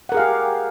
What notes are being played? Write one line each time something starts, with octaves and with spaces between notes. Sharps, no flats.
G4 G#4 A#4 F5 F#5